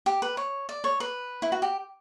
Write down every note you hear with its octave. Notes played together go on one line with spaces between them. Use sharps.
G4
B4
C#5
D5
C#5
B4
E4
F#4
G4